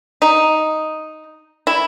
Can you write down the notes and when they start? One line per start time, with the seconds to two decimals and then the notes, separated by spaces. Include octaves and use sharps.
0.22 D#4
1.67 E4